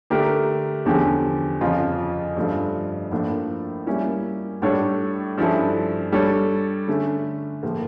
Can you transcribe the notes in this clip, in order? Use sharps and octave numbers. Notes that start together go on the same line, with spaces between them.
D3 A3 D4 G4 A#4
E2 D3 F3 C#4 G4
F2 C#3 F3 C#4 F4
G2 F3 A3 C#4 F4
A2 F3 A#3 D4 F4
G3 A#3 C#4 E4
A2 G3 D4 A4 C#5
G2 F3 C#4 E4 A4
G3 D4 A4 C#5
D3 A3 C#4
A2 F3 A#3